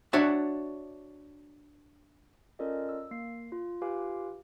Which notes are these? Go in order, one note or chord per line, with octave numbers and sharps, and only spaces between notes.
D4 F#4 C#5 D5 E5
C#4 F4 A4 A#4 D5 D#5
E6
A#3 C7
F4
F4 G4 B4 F5 G#5 D6